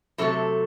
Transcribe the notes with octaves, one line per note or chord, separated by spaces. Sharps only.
C3 F#3 A3 A4